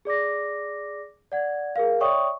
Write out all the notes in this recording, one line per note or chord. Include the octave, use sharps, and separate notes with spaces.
G#4 D5 D6 A#6
D5 F#5 G#6
G#4 A#4 F5
C#5 D5 E5 G5 C#6 D#6